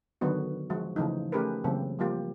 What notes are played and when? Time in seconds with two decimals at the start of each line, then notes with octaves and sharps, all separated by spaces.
0.21 D3 D#3 F#3 B3 F#4
0.70 F3 G#3 F#4
0.96 C#3 E3 F3 A3 D#4
1.32 A3 C#4 G4 G#4 A#4 B4
1.64 C#3 E3 F#3 A#3 C4
1.99 F3 G3 A#3 F4 G4